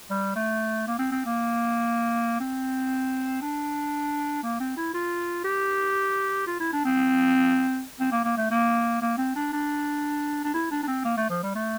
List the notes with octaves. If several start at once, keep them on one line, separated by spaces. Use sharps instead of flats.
G3
A3
A#3
C4
C4
A#3
C4
D4
A#3
C4
E4
F4
G4
F4
E4
D4
C4
C4
A#3
A#3
A3
A#3
A#3
C4
D4
D4
D4
E4
D4
D4
C4
A#3
A3
F3
G3
A3